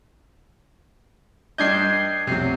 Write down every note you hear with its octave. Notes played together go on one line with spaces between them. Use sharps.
G2 D4 D#5 G6 G#6 C7
B1 F2 C3 F#3 C7